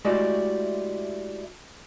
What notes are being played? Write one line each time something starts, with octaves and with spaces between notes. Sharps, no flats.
G#3 A3 E4 F#4 G4 D5